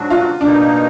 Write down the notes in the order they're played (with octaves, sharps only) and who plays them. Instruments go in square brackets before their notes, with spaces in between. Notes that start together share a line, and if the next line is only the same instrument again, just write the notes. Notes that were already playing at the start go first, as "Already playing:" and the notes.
Already playing: [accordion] G#2 F#3 D4 F#4
[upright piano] F4
[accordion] B2 A#3 D#4 [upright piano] D4